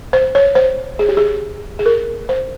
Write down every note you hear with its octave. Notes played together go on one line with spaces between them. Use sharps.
C5
C#5
C5
G#4
G4
G#4
G#4
A#4
C5